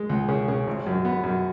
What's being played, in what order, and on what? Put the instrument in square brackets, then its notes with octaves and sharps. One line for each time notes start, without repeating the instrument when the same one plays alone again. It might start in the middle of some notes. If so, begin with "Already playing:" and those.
Already playing: [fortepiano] G#3
C#2
C#3
C#3
G#1
F#2
B3
F#2